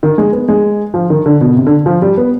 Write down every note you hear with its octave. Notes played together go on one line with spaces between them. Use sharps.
D#3
G#3
B3
G#3
F3
D#3
D3
B2
C3
D3
F3
G3
B3